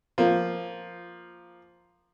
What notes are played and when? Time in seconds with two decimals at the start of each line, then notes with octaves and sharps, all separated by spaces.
0.18 F3 A#3